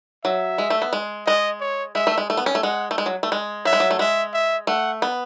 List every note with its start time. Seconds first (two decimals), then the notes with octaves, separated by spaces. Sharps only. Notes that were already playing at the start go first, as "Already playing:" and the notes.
0.24 F#3 E5
0.58 G#3
0.70 A3
0.82 B3
0.93 G#3
1.26 G#3 D#5
1.60 C#5
1.95 G#3 E5
2.07 A3
2.18 G#3
2.30 A3
2.37 B3
2.46 C#4
2.55 A3
2.63 G#3 F#5
2.91 A3
2.98 G#3
3.06 F#3
3.23 A3
3.32 G#3
3.65 F#3 E5
3.73 G#3
3.80 F#3
3.91 A3
3.99 G#3 E5
4.33 E5
4.67 A3 F#5
5.02 B3